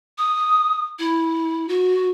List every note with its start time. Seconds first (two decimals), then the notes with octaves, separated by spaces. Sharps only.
0.18 D#6
0.99 E4
1.68 F#4